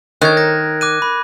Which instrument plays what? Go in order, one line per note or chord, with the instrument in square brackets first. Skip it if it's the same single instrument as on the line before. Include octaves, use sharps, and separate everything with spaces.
[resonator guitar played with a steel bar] D#3 [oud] A#4 C#5 [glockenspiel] F#6 G#6
[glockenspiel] A#6
D6 F#6 D#7
B5